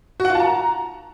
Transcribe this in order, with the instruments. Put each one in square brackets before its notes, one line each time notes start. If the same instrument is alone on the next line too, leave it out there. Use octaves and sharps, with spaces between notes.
[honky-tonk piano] F#4
F#5
F4
A5
A#5